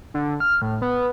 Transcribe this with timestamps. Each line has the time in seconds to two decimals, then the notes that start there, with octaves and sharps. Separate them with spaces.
0.14 D3
0.40 F6
0.62 A2
0.82 B3